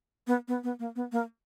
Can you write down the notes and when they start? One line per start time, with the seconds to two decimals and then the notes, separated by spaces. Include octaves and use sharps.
0.27 B3
0.48 B3
0.63 B3
0.79 A#3
0.96 B3
1.12 A#3